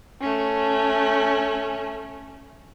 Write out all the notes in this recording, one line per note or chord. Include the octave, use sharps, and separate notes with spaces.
A3 C#4